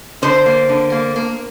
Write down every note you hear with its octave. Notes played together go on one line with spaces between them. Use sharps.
D3 C5
A#3
D3
A#3
A#3